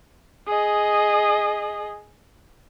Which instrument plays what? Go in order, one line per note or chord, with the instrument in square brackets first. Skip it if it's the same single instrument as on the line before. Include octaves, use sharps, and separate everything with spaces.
[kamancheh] G#4 D#5